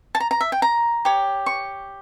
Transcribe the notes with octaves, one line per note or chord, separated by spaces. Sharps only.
A5
A#5
A#5
E5
G5
A#5
G4 C#5
C#6